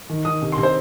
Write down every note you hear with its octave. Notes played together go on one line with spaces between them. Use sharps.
D#3
D#3 D#6
C3
C6
C3
C5